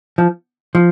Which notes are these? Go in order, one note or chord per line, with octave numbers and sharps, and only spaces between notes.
F3
F3